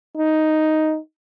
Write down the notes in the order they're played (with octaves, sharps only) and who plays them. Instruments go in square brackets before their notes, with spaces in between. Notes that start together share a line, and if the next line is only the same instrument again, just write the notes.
[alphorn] D#4